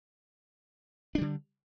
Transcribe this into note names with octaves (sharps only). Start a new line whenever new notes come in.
D3 G3 D4